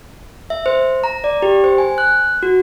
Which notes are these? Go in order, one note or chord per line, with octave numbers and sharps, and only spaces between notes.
E5
C5
A#5
D5
G4
C5
G#5
F#6
F#4